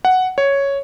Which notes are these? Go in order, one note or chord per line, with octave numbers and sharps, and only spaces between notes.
F#5
C#5